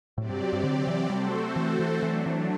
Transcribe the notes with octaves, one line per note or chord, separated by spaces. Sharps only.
A2 C3 F#3 C4 G4 D5
G2
G2
D3
E3
G3 A3 C4 F#4 A4 C5
E3
E3
E3 F#3 A3 D4
E3